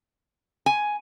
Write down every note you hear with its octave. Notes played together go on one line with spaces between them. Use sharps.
G#5